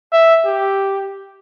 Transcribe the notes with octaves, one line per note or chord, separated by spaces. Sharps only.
E5
G4